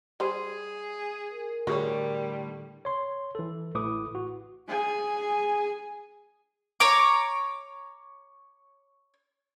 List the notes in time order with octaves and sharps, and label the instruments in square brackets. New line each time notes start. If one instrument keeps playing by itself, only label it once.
[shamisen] G3 C5 [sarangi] G#4
[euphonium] A#4
[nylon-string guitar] A2 D3 A3 [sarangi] G3 [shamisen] F#4 G#4 C#5
[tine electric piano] C#5 C6
E3 A4
A1 A2 E4 B4 D6 D#6
F#4
[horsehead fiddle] G#4 G#5
[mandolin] C#5 A#5 D6